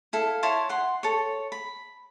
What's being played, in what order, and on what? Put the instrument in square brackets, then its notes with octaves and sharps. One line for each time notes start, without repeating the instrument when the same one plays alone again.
[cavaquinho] E4 A4 F5
E4 C#5 A5 C6
F#5 C6
A4 C#5
B5